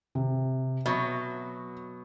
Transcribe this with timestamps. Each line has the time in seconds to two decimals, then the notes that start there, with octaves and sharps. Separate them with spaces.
0.15 C3
0.86 B2 F#3 E5